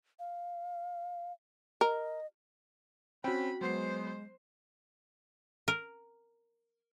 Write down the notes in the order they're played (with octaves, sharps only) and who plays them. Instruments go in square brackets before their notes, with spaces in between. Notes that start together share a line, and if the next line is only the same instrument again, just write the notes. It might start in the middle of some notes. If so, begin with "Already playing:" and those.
[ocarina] F5
[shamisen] A#4 [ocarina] D#5
[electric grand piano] C4 C#4 [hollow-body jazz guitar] F#4 G5 [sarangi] B5
[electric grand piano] F#3 B3 C7 [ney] G#3 [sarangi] C5
[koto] A#4